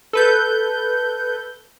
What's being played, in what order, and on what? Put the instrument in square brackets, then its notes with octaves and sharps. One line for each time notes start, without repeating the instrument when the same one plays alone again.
[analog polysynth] A4 B4 G6